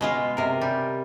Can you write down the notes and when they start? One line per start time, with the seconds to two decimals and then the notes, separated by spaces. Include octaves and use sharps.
0.01 B2 G#3 F4
0.37 C3 A#4
0.61 G3